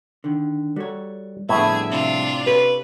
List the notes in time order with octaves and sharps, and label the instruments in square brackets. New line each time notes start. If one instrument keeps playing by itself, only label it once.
[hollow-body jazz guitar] D3 D#3
[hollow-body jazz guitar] G3 C#5 [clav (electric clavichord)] F#4 A4
[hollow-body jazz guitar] F2 G3 B3 [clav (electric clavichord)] A2 [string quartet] D3 G#4 G#6 [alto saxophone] E5
[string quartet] C3 D4 F4
[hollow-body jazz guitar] G4 A4 C#5 [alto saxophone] B4